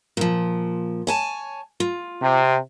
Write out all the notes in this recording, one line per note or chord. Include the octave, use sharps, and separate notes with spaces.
A#2 F3
C#5 G#5 A5
F4
C3